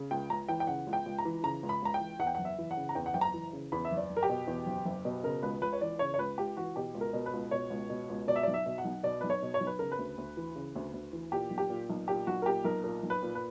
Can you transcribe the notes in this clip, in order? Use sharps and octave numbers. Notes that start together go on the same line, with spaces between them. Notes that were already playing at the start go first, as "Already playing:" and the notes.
Already playing: C#3
C#2 G5
C#2 A#5
E3 G5
G5
C#3 F#5
C#2
G5
C#2
A#5
E3
C#3 A#5
C#2
B5
C#2 A#5
G5
E3
E2 F#5
G5
F#1 F#5
E5
E3
F#5
C#3
A#5
E2 G5
F#5
F#1 G5
A#5
E3
C#3
E2 B5
E5
F#1
D5
F#1
A#4
G4
B2
E2
F#1
F#1
B2
C#3 A#4
C#2 B4
C#2 B4
C#5
E3 D5
C#3 C#5
C#5
C#2 B4
C#2 G4
E3 F#4
B2 G4
C#2
A#4
B2
B4
C#2
B2 C#5
C#2
B2
C#2
B2 D5
E5
D5
B1
E5
B2
F#5
B1
B2 D5
B1 B4
C#5
B2
C#5
B1
B4
C#3 A#4
B4
D2
D2
E3
C#3
D2
D2
E3
A#2 G4
B1
G4
A#2
B1
A#2 G4
B1 F#4
A#4
A#2 G4
B1 A#4
A#2 A#4
B1
B4
A#2
B4